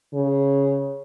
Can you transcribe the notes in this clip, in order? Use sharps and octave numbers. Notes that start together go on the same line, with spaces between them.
C#3